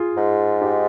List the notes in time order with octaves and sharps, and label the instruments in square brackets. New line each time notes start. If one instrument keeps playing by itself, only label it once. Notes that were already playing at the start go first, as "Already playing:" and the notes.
Already playing: [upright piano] F4 G#4
[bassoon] G#2
[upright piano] D#4 G4